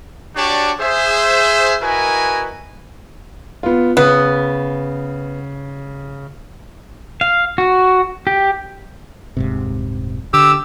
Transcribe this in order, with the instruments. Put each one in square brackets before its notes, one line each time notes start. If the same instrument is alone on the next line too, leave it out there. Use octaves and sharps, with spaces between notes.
[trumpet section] D4 F#4 G4 C#5 D5 A5
G#4 C5 E5
E4 F#4 A#4 B4 D#5 G#5
[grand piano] B3 F4
[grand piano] C#3 [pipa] B3
[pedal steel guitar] F5
F#4
G4
[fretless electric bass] D#1 G#2 C3
[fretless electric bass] D3 [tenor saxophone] G4 [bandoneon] E6